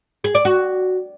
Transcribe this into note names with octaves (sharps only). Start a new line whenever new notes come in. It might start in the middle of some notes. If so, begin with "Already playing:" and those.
G#4
D5
F#4